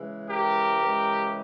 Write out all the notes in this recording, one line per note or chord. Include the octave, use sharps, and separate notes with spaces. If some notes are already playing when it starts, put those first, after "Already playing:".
Already playing: C#3 E3 G#3
G4 A#4
C#3 E3 G#3